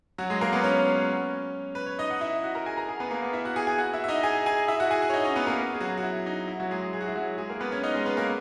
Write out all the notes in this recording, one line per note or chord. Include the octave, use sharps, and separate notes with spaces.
F#3 F#4
G#3 G#4
A#3 A#4
B3 B4
C#4 C#5
B4
C#5
D#4 D#5
F#5
E4 E5
F#4 F#5
A#4 A#5
G#4 G#5
A#4 A#5
G#4 G#5
B3 B4
A#3 A#4
B3 B4
E4 E5
F#4 F#5
G#4 G#5
G#4 G#5
F#4 F#5
E4 E5
E5
D#4 D#5
G#4 G#5
G#4 G#5
E4 E5
F#4 F#5
G#4 G#5
F#4 F#5
C#5
D#4 D#5
C#4 C#5
B3 B4
A#3 A#4
G#4
F#3 F#4
F#4
E4
D#4
E4
F#3 F#4
G#3 G#4
G#3 G#4
G#4
F#4
E4
F#3 F#4
G#3 G#4
A#3 A#4
B3 B4
C#4 C#5
D#4 D#5
G#3 G#4
B3 B4
A#3 A#4